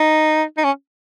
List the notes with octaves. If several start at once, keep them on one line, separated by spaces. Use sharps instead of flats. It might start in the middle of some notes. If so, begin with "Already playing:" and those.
Already playing: D#4
D#4
C#4